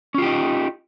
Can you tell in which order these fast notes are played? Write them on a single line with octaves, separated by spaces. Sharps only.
C#4 F4 G4 D#4